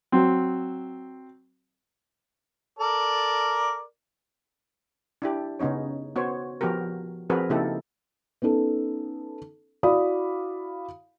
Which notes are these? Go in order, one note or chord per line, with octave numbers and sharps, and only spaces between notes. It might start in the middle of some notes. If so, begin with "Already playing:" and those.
F#3 C4
A4 A#4 D5
D4 E4 G4
C#3 B3 C#4 D#4 C#5
B3 F#4 C5 C#5
F3 B3 F#4 G4 A#4
F3 C4 F#4 G#4 A#4 B4
C#3 A#3 D#4 E4 G4 A4
B3 C#4 D#4 A4
E4 F#4 D5 F5 B5 D#6